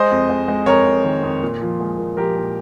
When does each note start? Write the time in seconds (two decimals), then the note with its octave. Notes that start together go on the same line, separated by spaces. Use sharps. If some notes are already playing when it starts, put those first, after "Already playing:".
Already playing: G#3 C5 D#5
0.11 F2
0.29 G#3
0.48 G#3
0.66 F2 A#4 C#5
0.86 F2
1.04 D#3
1.23 F2
1.42 A#2
1.61 F3
1.80 G#3
1.98 A#2
2.17 F3 G4 A#4
2.36 A#2